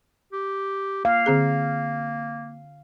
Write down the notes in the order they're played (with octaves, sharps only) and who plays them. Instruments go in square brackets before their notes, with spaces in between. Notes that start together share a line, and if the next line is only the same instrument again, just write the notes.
[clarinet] G4
[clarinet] A#3 [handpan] F5
[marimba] D3 C4 G#4